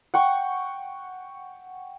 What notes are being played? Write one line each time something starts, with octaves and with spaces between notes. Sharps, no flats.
F#5 G5 C#6